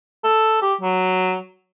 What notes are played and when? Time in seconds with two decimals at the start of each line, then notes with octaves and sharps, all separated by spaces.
0.24 A4
0.62 G4
0.81 F#3